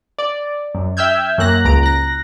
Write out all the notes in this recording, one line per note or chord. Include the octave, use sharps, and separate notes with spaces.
D5
F#2
E5 G5 E6 F6 G6 G#6
F#2 A#3 F#6 A#6
C#2 A#5 D7
F#6 A#6